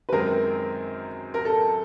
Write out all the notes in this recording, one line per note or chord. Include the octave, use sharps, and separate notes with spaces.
B4
F#2 D#3 G#3 C4 A#4
A#4
A4